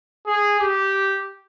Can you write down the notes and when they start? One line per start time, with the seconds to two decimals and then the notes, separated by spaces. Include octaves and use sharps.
0.27 G#4
0.60 G4